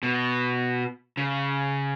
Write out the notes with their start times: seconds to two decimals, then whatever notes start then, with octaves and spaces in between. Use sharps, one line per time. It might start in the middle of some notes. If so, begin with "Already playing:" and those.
0.03 B2
1.17 C#3